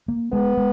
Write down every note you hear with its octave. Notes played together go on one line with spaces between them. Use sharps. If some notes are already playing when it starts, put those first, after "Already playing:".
A#3
G#3 B3
G#3